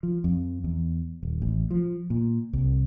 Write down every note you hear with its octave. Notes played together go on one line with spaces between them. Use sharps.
F3
F2
E2
D#1
A1
F3
A#2
C2